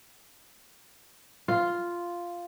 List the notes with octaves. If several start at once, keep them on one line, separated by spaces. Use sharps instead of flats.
F4